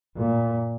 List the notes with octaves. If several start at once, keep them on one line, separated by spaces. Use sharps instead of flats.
A#2